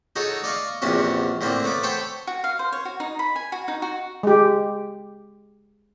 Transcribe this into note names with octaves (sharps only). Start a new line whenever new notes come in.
D#4 F#4 G#4 A4 C#5
D5 D#5 F5 C#6
A#1 E2 C3 C#4 D4 F#4
A2 D3 A#3 C4
A3 B3 D6
A4 C5 C#5 G5 A5 B5
F#4
F5
C5
C#5
F#4
D#4
B5
G#5
F#4
D#4
F#4
G#3 G4